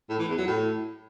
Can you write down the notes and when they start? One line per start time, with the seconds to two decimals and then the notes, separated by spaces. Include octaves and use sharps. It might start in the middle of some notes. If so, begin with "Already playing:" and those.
0.09 A2
0.19 E3
0.28 E2
0.38 F#3
0.47 A2